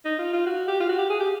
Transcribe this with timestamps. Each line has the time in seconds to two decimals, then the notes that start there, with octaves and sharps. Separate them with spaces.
0.05 D#4
0.19 F4
0.33 F4
0.46 F#4
0.68 G4
0.80 F4
0.89 F#4
0.99 G4
1.10 G#4
1.20 G4